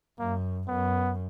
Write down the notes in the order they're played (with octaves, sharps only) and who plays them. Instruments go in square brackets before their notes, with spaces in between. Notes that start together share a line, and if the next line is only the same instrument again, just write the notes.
[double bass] F#2 [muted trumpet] A#3
[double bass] F#2 [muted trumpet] B3